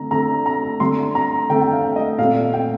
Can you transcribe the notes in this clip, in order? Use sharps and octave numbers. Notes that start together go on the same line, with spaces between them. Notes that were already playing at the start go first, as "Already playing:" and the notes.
Already playing: D3 A3 C4 A#5
D3 A3 C4 A#5
A#5
D3 A3 C4 C6
A#5
D3 A3 C4 G5
G5
F5
D#5
A#2 A3 C4 F5
G5